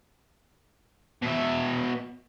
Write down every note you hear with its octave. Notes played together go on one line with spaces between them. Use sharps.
B2 E5